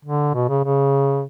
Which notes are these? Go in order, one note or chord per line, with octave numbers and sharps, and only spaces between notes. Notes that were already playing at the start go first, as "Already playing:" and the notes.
D3
B2
C#3
C#3